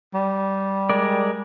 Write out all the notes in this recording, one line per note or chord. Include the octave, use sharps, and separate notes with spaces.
G3
G#3 A#4 D5